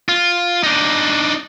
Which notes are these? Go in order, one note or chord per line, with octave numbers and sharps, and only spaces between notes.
F4
D4 D#4